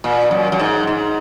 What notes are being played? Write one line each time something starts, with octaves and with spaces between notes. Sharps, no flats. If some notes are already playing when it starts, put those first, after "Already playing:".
A#2
F#2
F#2
G#2
G#2